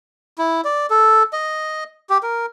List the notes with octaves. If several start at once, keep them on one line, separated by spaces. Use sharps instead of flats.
E4
D5
A4
D#5
G4
A#4